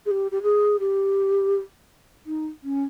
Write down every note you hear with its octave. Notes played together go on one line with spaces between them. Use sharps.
G#4
G4
G4
G#4
G4
D#4
C#4